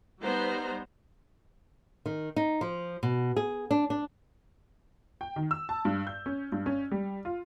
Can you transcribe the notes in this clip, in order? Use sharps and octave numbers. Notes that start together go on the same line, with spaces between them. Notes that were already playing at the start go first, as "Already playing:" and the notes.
G3 B3 D#4 C5 A#5
D#3
D#4
F3
B2
G#4
D4
D4
G5
D#3
E6
A5
G2
G6
C#4
G2
C#4
G3
F4